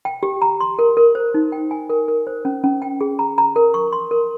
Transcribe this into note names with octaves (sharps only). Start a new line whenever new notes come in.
G5
G4
A#5
C6
A#4
A#4
C5
D#4
G5
G#5
A#4
A#4
C5
C#4
C#4
G5
G#4
A#5
A#5
A#4
C#6
C6
A#4